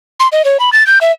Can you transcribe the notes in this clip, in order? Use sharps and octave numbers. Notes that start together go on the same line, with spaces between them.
C6
D#5
C#5
B5
A6
G6
E5